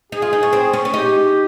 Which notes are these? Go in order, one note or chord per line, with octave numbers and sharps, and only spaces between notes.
D#4 G#4
F4
D#4
C#4
C4
C#4
C#4
D#4 G4